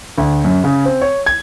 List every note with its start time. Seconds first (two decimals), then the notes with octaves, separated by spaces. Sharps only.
0.18 D2
0.44 F#2
0.64 C#3
0.85 C4
1.01 C#5
1.26 G#6